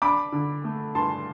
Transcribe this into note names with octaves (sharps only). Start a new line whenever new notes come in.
D4 B5 D6
D3
A3
G2 A5 C6